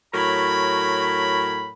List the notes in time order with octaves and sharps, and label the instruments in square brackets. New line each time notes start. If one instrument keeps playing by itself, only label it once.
[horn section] A2 F#3 A#4 B5